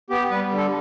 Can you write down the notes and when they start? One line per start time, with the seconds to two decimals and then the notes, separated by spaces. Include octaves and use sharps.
0.10 B3 G4
0.30 G3 B4
0.51 D3
0.57 A4